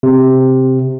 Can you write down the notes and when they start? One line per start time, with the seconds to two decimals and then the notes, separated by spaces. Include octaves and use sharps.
0.03 C3